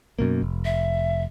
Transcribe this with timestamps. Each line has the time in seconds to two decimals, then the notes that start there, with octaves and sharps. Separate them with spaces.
0.19 F#2 B2 A#3
0.42 F1
0.65 E5